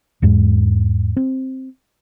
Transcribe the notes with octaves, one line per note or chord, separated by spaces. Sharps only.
E2 G#2 G#3
C4